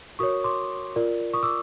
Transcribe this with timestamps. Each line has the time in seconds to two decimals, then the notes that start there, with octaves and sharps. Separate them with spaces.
0.19 F#4 A#4 C#5 C#6 D#6
0.44 C6 D6
0.96 F4 A#4 D5
1.34 C#6 D#6
1.43 D6 E6